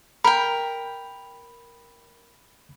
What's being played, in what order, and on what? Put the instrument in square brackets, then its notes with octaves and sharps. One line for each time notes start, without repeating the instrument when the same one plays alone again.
[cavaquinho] A#4 G5 [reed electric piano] B5